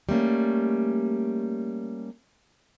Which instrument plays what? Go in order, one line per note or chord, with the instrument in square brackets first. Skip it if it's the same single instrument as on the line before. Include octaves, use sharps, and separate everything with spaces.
[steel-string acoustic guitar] G3 A3 A#3 C#4